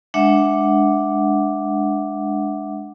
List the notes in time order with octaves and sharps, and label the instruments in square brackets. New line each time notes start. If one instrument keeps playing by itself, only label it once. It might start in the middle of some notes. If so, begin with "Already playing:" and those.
[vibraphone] G#3 D4 E5 F#5 D6